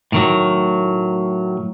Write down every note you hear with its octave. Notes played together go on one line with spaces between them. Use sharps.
A2 D#3 F#3